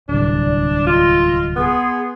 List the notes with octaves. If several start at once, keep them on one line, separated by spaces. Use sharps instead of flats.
D1 C2 D4 D5
F4 D#5 C6 E6
B3 G#4 C6